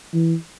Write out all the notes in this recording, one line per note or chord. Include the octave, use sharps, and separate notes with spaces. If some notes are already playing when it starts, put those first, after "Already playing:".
E3